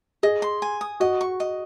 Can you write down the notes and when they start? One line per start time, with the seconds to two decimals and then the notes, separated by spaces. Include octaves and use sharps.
0.23 G#4 D#5
0.42 C6
0.62 G#5
0.81 D#6
1.00 F#4 D#5
1.21 C#6
1.40 D#5